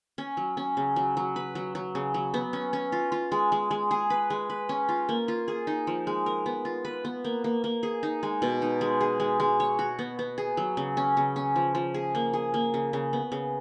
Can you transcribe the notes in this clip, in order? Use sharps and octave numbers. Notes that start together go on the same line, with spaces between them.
C#4
F#3
C#4
C#3
F#3
F#3
B4
F#3
F#3
C#3
F#3
B3
C#4
C#4
F4
F4
G#3
G#3
G#3
G#4
B4
G#3
B4
C#4
F4
A#3
F4
G#4
D#4
F3
G#3
A#4
B3
F4
B4
B3
A#3
A#3
A#3
G#4
D#4
G#3
B2
D#4
G#3
G#4
G#3
G#3
C#5
F#4
B3
B3
G#4
F#3
C#3
C#4
C#3
C#4
F3
F3
G#4
A#3
G#4
A#3
C#3
C#3
B3
C#3